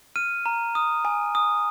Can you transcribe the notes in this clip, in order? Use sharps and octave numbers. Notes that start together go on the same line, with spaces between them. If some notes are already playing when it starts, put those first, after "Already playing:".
F6 D#7
A#5
D#6
G#5
D#6